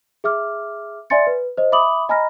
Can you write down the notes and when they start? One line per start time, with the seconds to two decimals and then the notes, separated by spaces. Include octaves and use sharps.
0.24 G#4 E5 D6 F6
1.10 D5 E5 G#5 C6 A6 C#7
1.27 B4
1.57 C5 D#5
1.72 E5 B5 D6 D#6 F#7
2.09 D#5 G#5 A#5 B5 F6 A#6